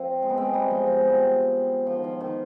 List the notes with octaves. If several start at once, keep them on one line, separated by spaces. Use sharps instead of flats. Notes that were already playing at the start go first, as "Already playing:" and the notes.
Already playing: F3 C4
G#3
B3
G#3 C4
G3 B3
F3 G#3
F3
G3
F3
F3
D#3
F3
D#3